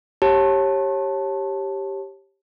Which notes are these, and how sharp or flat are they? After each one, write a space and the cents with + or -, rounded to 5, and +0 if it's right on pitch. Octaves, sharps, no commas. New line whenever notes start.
G4 +0 C#5 -25 A5 +0